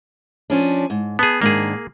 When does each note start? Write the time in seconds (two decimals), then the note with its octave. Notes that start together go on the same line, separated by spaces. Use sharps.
0.50 F3 C#4 D4
0.90 G#2
1.19 B3 G#4 A5
1.42 G#2 D#3 A#3 D4 G#4